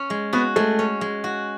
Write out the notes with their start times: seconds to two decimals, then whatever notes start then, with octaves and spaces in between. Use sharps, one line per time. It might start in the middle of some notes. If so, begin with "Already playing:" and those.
Already playing: C#4
0.10 G#3
0.33 B3 F#4
0.56 G#3 A3
0.79 C#4
1.01 G#3
1.24 F#4